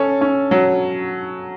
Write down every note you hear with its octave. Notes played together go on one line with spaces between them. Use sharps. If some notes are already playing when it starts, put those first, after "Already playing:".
Already playing: C#4 A4
C#4
F#3